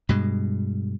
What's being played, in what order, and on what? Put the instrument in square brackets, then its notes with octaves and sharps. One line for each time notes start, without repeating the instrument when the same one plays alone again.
[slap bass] G2 B2 G#3